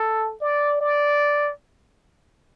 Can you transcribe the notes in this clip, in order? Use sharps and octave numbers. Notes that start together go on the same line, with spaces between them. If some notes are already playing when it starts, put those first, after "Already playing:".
Already playing: A4
D5
D5